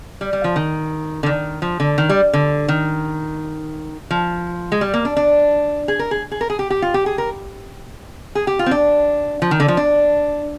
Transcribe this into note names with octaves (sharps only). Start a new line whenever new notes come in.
G3
G3
F3
D#3
D3
D#3
F3
D3
D#3
G3
D3
D#3
F3
G#3
G3
A#3
D4
D4
G#4
A#4
G#4
G#4
A#4
G#4
G4
G4
F4
G4
G#4
A#4
G#4
G4
F4
C4
D4
F3
D#3
D3
F3
D4